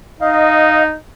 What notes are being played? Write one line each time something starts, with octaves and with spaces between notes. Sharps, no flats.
D#4 D#5 F5